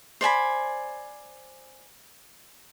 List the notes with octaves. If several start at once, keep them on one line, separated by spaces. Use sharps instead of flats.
C5 D5 G#5 B5